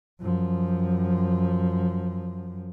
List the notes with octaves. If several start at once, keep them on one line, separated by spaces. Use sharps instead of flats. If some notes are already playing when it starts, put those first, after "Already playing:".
F#2 F3